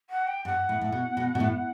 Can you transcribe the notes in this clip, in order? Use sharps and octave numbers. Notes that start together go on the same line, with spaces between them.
F#5
G5
G2 F#5
A2
A2
B2
B2
B2
A2